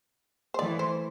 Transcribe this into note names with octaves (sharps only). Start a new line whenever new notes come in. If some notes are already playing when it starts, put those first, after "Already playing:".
C5
E3 A3 D5
C5